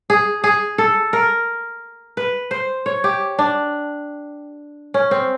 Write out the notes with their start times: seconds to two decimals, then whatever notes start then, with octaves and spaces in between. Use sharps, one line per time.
0.10 G#4
0.44 G#4
0.78 A4
1.13 A#4
2.17 B4
2.51 C5
2.86 C#5
3.04 G4
3.39 D4
4.94 C#4
5.11 C4